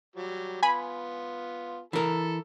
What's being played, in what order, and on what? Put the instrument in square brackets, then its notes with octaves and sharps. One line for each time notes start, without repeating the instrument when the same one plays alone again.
[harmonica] F#3 G3
[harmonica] B3 F4 [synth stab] G#5 B5
[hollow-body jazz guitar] E3 A#4 [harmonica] A4